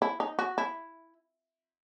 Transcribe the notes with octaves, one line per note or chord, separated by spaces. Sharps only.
E4
D#4
F#4
E4